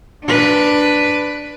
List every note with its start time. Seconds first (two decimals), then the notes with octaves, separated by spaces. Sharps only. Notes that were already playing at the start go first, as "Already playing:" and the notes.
0.24 D4 B4